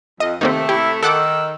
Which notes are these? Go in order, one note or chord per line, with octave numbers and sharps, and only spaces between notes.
F2 D#5
C3 D#3 A3 A#3 C4
E4 G4
D#3 A4 F#5 D6 E6